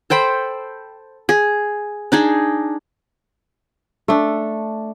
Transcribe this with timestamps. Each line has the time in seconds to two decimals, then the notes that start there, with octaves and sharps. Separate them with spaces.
0.10 A4 C5 G5 B5
1.29 G#4
2.12 D4 D#4 G#4
4.08 A3 D4